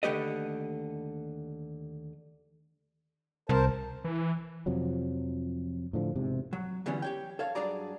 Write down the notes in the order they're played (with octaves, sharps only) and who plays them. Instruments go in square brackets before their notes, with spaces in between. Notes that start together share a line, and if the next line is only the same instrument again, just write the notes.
[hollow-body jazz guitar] D#2 D3 A3 G4 B4 D#5
[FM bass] C2 [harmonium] A#4 C5 A5
[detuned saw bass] E3
[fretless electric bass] F2 C3 F3 F#3
A2 D3 F3
E1 G#2 C3
[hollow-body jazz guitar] F#3
D3 E3 F#3 G3 B3 C#4
G4 C#5 G5
A4 C#5 F5
G2 F#3 D4 G#4 D5 A#5